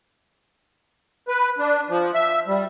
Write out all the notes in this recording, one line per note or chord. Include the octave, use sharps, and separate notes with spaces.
B4
D4
F3
E5
G3